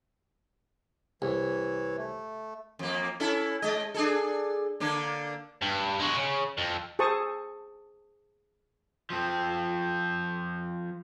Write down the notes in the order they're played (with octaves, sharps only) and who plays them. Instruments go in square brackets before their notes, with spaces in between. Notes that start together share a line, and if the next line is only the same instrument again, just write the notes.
[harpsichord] C2 [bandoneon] E3 C#5
[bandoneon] A3
[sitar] F2 A#3
C#4 E4 A4
G#3 D#5
D4 G#4 A4
D3 A#3 D4
[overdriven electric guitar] G2
G#3 F#4
C#3
F2
[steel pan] G#4 A4 C5 A5 C#6 D#6
[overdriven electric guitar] F3 C4